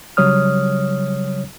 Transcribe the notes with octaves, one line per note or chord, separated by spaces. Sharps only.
C#3 F#3 G3 C#5 D#6 F6